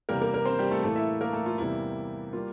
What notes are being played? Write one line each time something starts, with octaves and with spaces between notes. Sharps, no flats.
E2 C3 G3 A#3 A#4
A#3 A#4
A#3 A#4
C4 C5
G3 G4
A3 A4
A2 E3 A3 A#3 A4
E4 E5
A#3 A#4
A3 A4
F4
E2 C3 G3 A#3 E4
G3 A#3 F4